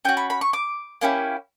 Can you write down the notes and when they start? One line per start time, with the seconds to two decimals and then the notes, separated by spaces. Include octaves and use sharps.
0.05 C#4 G5
0.09 F#4
0.17 B5
0.30 B5
0.41 C#6
0.53 D6
1.01 A#3 C#4 E4 G4